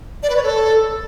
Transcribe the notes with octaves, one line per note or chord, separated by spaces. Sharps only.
D5
B4
C#5
A4